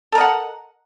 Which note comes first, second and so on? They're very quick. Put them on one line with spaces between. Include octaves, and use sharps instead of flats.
A4 A#4 D#5 F#5